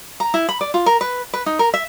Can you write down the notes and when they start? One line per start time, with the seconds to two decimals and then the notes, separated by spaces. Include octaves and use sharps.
0.20 A#5
0.34 E4
0.49 B5
0.61 D5
0.74 F4
0.86 A#4
1.01 B4
1.34 B4
1.46 D#4
1.59 A#4
1.74 E5